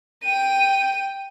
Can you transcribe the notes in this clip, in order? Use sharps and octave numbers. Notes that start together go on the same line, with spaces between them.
G5 D#7